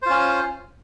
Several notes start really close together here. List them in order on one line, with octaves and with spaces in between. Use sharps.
C5 F4 C#4